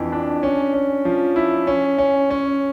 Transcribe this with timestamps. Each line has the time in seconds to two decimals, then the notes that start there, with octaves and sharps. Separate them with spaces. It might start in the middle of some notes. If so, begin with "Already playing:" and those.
Already playing: F2 E3 D4
0.12 D4
0.43 C#4
0.73 C#4
1.05 F3
1.36 E4
1.67 C#4
1.98 C#4
2.30 C#4